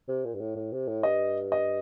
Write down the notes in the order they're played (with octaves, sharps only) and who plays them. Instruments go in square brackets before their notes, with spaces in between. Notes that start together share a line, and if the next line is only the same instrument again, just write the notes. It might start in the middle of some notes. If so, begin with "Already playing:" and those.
[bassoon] C3
A#2
G2
A2
A2
C3
A2
[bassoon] G2 [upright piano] D#5
[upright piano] D#5